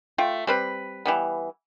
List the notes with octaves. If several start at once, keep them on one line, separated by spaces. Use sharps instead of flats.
A3 F4 G5
G3 C4 B4
E3 G3 B3